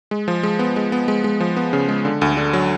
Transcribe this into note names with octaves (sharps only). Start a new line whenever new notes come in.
G#3
F3
G#3
B3
G#3
B3
G#3
G#3
F3
B3
C#3
G#3
D3
D2
D3
F#3